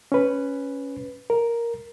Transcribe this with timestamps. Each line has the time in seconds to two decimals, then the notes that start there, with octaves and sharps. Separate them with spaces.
0.12 C#4 B4
1.30 A#4